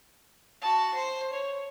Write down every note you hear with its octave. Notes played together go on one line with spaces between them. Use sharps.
F#4 A5
C5
C#5